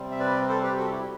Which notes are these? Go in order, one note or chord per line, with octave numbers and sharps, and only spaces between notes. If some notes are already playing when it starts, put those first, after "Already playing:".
Already playing: C3 G3 C4
E5
B4 D5
A4 C5
G4 B4
F#4 A4
E4 G4